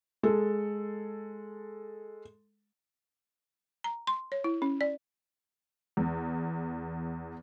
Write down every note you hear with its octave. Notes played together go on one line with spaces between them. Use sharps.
G#3 A4
A#5
C6
C#5
E4
C#4
D5
E2